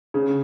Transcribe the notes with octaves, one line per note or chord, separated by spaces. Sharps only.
C#3